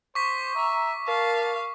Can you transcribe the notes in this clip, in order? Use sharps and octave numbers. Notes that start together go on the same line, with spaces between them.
C5 C#6 D6 B6
E5 A#5
A#4 F5 A5